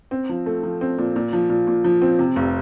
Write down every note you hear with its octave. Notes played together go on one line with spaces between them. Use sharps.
C4
F3
A3
F3
C4
A#2
A#2
F3
A#2
A#2
F3
C4
C3
F1